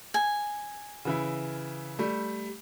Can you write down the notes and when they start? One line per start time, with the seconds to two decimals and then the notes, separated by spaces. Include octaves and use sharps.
0.14 G#5
1.05 C#3 E3 E4
1.99 G3 A3